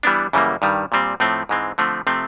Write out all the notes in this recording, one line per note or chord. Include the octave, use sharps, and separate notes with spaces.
E3 G3 B3 D4
F#2 C#3 E3 G3 A#3
G2 D#3 G3
A#2 G3 C4
A2 F3 A3 C4
G#2 E3 G#3 C4
D3 F3 A3 C4
C3 F3 A3 C4